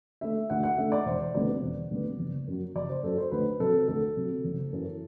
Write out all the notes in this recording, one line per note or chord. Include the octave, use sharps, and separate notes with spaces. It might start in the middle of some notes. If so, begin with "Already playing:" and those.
D3 A3 E5
D2 F#5
F#5
D3 A3 E5
D5
E1 C5
D2 C3 G3 B3 D5
E1
D2 C3 G3 B3
F#1
F#2 F#3
F#1 D5
C5
F#2 F#3 A4
C5
D2 B4
C3 F#3 A4
D2 A4
C3 F#3
F#1
F#2 E3